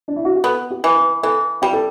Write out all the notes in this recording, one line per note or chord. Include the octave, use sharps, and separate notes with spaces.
D4
E4
F#4
G4
B3 A4
G4
E3
B4
E3 A4
G3 G4
A4